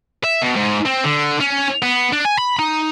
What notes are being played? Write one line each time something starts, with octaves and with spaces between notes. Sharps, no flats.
E5
B2
G#2
C4
D3
C#4
B3
D4
G#5
B5
D#4